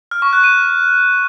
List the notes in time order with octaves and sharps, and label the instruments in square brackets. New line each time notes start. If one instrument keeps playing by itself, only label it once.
[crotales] F6
C#6
F#6
D#7